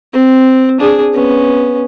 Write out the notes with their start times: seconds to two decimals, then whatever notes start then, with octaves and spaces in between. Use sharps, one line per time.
0.13 C4
0.80 D4 G#4
1.13 B3 C#4